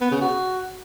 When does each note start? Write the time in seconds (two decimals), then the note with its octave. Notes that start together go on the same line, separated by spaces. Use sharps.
0.01 B3
0.11 C#3
0.21 F#4